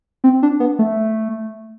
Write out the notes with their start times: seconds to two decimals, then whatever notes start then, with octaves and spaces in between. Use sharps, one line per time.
0.24 C4
0.43 D4
0.60 B3
0.79 A3